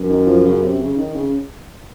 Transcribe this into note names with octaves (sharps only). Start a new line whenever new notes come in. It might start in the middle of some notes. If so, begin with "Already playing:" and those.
Already playing: F#2
D#3
F3
C#3
C3
C#3
D#3
C#3